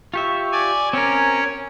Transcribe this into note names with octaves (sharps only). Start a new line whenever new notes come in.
F4 G4 E5 C#6
D5 G#5
C4 C#4 A#4 C#5 G#5